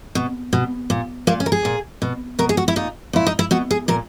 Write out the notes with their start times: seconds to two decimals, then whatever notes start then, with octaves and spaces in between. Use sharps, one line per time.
0.15 B2
0.53 B2
0.90 A#2
1.27 A#2 A#3
1.40 C#4
1.46 A#4
1.52 G#4
1.65 A#2
2.02 B2
2.39 B2 A#4
2.49 G#4
2.57 F#4
2.68 E4
2.76 A#2 D#4
3.13 A#2 E4
3.26 D#4
3.39 E4
3.51 B2 F#4
3.71 G#4
3.88 A#2 A#4